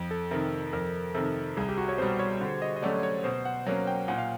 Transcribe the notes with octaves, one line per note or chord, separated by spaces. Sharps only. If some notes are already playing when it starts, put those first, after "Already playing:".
Already playing: F2
A4
C3 D#3 A#4
F2 A#4
C3 D#3 A4
C2 G#4
G4
F#4
C#5
B2 G3 C5
C#5
D3
D#5
D#5
F#3 A3 C#4 D5
C#5
B2 C5
F#5
F#3 A#3 C#4 F#5
G5
A#2 F#5
F5